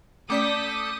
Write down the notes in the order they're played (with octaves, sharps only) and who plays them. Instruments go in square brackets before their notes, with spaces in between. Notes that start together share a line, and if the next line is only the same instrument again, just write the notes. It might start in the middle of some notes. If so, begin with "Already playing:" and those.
[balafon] A3 C#4 D5 [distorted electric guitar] A4 [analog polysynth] D6 G6 B6 [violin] D#6